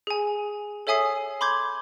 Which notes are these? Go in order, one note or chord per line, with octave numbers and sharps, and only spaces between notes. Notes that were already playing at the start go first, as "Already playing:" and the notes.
G#4 G#5
A4 C#5 E5 G#5 D#6 C7
B5 C6 D6 G6 G#6